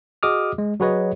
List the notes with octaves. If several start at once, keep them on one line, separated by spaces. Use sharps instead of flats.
F#4 G#4 D#5 D6 D#6 F6
G#3
F#3 F#4 G#4 B4 C#5 D#5